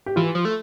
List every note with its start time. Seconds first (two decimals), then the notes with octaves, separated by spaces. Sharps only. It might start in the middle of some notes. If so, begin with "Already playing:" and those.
0.06 G4
0.16 E3 F4
0.35 F3
0.45 A3